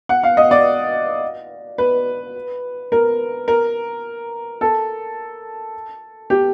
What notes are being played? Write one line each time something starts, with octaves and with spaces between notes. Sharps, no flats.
F#5
F5
D#5
D5
B4
A#4
A#4
A4
G4